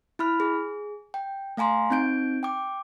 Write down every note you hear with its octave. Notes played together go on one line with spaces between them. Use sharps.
E4 B5 F6
G#4
G5
A3 F5 G#5 A#5 C6
C4 D#4 G6 D7
G5 D6